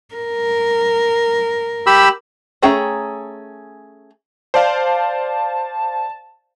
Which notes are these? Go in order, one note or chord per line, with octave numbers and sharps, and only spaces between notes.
A#4
G4 B5 E6
A3 C#4 G#4 G5 A#5
C5 D5 F5 A5